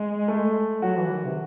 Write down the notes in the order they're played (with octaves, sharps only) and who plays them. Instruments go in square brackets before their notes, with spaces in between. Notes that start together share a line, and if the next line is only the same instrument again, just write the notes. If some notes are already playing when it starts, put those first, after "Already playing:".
Already playing: [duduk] G#3
[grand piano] A3
[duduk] F#3 [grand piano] F#4
[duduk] E3
D#3
C3